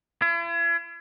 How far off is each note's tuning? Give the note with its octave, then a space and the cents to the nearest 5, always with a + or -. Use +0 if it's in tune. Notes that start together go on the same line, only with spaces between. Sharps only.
E4 +45